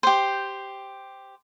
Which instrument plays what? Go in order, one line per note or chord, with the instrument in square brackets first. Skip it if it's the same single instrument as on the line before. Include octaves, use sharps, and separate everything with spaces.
[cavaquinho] G4 C5